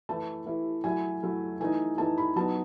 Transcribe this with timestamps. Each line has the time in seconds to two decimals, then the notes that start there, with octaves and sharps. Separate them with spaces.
0.09 E3 A3 E4 A5
0.46 E3 A3 E4
0.84 F#3 A3 E4 G#5
1.23 F#3 A3 E4
1.60 E3 A3 D#4 G#5
1.97 E3 A3 D#4 A5
2.18 B5
2.36 F#3 B3 D#4 A5